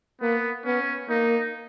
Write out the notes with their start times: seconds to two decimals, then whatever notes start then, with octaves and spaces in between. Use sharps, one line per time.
0.21 A#3 B3
0.65 B3 C#4
1.09 A#3 D#4